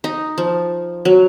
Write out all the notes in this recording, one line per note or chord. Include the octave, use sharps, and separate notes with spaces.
D#4
F3
F#3